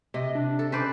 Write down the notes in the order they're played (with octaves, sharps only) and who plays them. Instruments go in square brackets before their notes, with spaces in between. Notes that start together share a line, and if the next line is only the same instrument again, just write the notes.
[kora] C3 [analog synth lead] D#5
[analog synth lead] D4
[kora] A4
[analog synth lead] C#4 [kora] B4 C5 D5